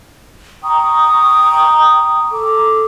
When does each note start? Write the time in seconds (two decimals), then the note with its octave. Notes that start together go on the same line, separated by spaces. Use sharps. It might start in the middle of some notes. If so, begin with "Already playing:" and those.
0.64 G5 A#5 C#6 D#6
2.32 A4 D6